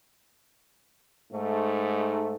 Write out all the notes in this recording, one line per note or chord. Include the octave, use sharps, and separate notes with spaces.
G#2 A3